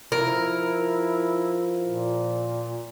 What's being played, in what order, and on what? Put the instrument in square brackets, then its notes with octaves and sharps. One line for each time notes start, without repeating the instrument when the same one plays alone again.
[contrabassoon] F3 [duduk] E4 [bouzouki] A#4
[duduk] A#2